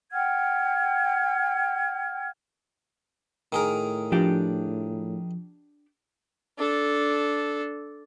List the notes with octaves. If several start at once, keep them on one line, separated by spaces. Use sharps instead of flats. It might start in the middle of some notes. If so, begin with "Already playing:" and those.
F#5 G5 F6 G#6
A2 D#3 G#4 A#4
F3 D4 G4 G5
D4 A4